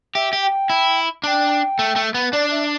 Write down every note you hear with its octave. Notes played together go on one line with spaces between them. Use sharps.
G4 E5
G4
G5
E4
D4 G5 A5
A3
A3
B3
D4 D5
E5